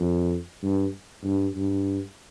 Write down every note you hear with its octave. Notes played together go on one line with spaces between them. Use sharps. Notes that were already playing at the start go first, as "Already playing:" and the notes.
Already playing: F2
G2
G2
G2